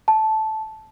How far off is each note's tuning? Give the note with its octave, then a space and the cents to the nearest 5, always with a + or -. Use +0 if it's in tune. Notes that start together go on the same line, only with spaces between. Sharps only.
A5 -10